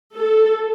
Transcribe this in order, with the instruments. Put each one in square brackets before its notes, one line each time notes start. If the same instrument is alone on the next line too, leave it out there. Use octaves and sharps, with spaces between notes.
[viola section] A4